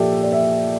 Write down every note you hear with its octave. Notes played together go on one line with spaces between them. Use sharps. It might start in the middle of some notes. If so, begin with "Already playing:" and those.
Already playing: A#2 F3 A#3 G4 A4 D5 E5
D5
E5